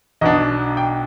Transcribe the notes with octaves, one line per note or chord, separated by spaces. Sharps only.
B1 B2 B3 D4 D#5
G5